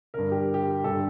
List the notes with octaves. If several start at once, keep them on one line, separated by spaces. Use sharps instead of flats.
G2 D3 A#4
G4
G4
G2 D3 A4